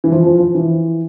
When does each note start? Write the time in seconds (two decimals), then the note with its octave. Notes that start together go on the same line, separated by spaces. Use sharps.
0.04 E3
0.12 F3
0.26 F3
0.39 F3
0.55 E3